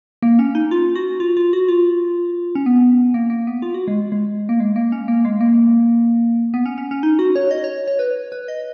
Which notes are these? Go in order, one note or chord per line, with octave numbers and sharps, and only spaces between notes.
A#3
C#4
D#4
F4
F#4
F4
F4
F#4
F4
C#4
B3
A#3
A#3
B3
F4
F#4
G#3
G#3
A#3
G#3
A#3
C#4
A#3
G#3
A#3
B3
C#4
C#4
C#4
D#4
F#4
C#5
D#5
C#5
C#5
B4
B4
D#5